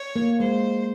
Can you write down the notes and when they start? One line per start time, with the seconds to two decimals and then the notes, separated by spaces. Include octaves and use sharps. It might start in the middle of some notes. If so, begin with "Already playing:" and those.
Already playing: C#5
0.16 A#3
0.40 G#3 C5